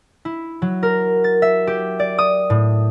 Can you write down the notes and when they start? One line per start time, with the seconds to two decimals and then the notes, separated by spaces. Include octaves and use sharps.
0.25 E4
0.62 F#3
0.83 A#4
1.24 A6
1.42 E5
1.67 G4
2.00 D5
2.18 D#6
2.50 A2